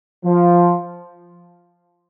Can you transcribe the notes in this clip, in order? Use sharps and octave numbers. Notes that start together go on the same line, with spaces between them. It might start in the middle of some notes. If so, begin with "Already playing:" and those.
F3